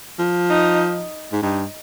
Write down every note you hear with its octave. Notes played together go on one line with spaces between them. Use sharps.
F3
D#4
G#2
G2 D#4